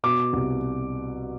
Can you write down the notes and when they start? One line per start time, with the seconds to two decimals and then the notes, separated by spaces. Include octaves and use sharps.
0.03 B2 D6
0.33 C2